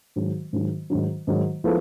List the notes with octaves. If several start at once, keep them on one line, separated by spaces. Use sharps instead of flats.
G#2 D#3 F#3
G#2 D#3 F#3
G#2 D#3 F#3
G#2 D#3 F#3
F3 G#3 B3 E4 A4